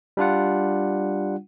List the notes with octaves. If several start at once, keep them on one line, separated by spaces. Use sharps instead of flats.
G3 D4 F4 F#5